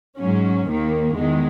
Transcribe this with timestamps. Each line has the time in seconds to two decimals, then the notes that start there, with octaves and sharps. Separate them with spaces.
0.18 G#2 F#3 C#4
0.67 D#2 D#3 A#3
1.15 E2 D#3 G#3